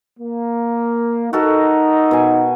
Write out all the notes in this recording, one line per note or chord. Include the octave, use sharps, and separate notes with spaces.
A#3
D#4 F#4 A4 A#4
B2 G#5